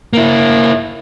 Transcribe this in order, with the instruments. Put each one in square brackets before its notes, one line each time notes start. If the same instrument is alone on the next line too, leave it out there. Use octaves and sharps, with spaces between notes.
[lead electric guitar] A#3 E4